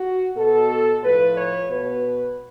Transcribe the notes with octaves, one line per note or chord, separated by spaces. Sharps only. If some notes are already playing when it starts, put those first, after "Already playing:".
Already playing: F#4
B2 A4
A2 F3 B4
C#5
B2 B4